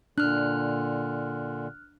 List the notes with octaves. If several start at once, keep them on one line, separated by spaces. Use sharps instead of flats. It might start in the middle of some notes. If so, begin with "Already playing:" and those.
A#2 D3 D4 F6 F#6